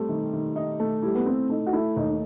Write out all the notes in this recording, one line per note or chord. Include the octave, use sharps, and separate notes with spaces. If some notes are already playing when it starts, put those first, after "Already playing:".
Already playing: G3 A3 C4
D#3
D#3
D#4
A3
G3 E4
B3
C4 E4
A3 D#4
F#4
A3 E4
D#2 D#4
D#4